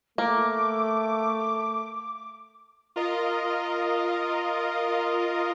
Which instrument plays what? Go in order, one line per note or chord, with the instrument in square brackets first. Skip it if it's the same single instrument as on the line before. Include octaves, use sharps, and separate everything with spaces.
[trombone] A3 [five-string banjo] A#3 [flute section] D6
[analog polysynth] F4 A#4 D#5